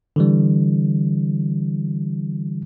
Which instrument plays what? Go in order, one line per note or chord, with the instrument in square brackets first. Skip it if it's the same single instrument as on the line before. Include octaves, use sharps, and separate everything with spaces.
[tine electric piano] D3 E3 G3